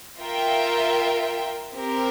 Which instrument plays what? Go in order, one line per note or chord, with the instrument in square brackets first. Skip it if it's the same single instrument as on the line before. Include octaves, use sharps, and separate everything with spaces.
[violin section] F4 A#4 E5 G5
C4 G4 A#4